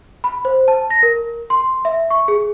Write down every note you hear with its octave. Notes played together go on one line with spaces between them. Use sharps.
B5
C5
A5
A#6
A#4
C6
E5
C#6
G#4